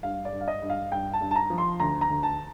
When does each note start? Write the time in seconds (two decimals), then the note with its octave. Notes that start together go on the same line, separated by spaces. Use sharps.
0.03 G2 F5
0.25 D5
0.32 G2
0.41 F5
0.48 D#5
0.62 G2
0.70 F5
0.92 G2 G5
1.13 A5
1.21 G2
1.31 A5
1.36 A#5
1.50 F3
1.58 C6
1.79 D2 A#5
2.01 A#5
2.09 D2
2.23 A5